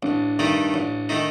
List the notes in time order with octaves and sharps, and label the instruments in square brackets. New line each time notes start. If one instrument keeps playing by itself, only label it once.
[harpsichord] A1 [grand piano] D4
[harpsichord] G2 D#3 A3 D#4
A1
D#3 A3 D#4